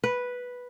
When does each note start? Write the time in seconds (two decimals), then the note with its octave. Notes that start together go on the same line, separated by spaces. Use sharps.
0.04 B4